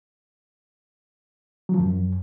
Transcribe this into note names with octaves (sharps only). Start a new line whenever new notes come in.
F#3
F3
F#2